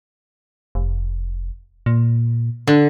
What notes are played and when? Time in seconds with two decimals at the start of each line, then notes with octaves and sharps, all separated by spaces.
0.75 F1
1.86 A#2
2.67 D3